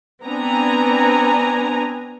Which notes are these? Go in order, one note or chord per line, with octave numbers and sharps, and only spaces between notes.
B3 C4 D4 G#5 A#5